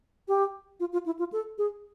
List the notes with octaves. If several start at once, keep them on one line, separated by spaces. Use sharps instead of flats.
G4
F4
F4
E4
F4
A4
G#4